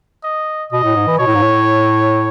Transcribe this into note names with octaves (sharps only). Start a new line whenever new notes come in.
D#5
B2 D#5
A2
G#2
E3
B2 C#5
A2
G#2
A2